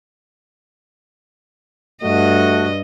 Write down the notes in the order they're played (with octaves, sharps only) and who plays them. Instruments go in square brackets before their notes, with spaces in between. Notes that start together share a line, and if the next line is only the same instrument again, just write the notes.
[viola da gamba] G2 D#5 [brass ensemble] A3 F#4